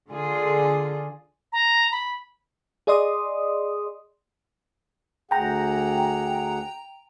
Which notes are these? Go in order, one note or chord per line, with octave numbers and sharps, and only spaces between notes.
D3 F4 G#4
A#5
B5
G#4 D5 D#5 C6 D#6
D2 G#4 F#5 G5 A#5